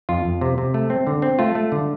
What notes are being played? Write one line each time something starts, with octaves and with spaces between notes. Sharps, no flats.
F2 F4
F2
C3
C3
A3
C4
D3
C4
A3 F4
A3
D3